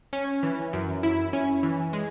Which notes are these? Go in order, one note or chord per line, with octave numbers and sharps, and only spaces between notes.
C#4
E3
F#2
E4
C#4
E3
G#3